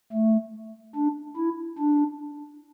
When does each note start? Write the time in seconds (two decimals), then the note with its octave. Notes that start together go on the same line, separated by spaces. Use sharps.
0.13 A3
0.95 D4
1.37 E4
1.78 D4